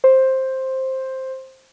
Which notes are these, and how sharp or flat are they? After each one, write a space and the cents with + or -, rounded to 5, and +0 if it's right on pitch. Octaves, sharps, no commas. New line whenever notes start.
C5 +10